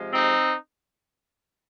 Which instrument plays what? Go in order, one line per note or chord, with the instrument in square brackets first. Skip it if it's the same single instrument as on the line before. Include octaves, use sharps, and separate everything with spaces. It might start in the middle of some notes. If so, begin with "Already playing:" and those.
Already playing: [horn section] C3 F3 G#3
C4 D#4